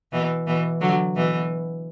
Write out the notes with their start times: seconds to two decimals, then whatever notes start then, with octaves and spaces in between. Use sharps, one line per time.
0.12 B2 E3
0.47 B2 E3
0.81 D3 F#3
1.15 B2 E3